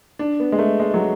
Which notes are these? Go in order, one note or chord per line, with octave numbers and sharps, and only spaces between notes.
D4
B3
G#3
A3
G#3
F#3